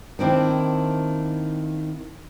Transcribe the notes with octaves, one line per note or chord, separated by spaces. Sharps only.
D#3 A#3 C4 D4 E4